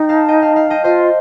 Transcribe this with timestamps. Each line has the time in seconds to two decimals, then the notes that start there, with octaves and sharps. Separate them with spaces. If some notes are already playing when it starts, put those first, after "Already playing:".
Already playing: D#4 G5
0.09 F5 A5
0.28 D#5 G5
0.42 F5 A5
0.56 F5 A5
0.70 D#5 G5
0.84 F4 C5 D#5